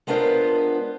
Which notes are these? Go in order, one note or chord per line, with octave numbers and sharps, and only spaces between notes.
G#3 B3 D4 F4 A#4 C5